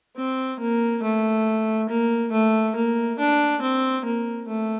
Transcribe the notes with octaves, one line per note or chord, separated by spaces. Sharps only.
C4
A#3
A3
A#3
A3
A#3
D4
C4
A#3
A3